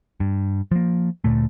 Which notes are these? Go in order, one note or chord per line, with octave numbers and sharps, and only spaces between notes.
G2
F3 A#3
D2 A#2 A3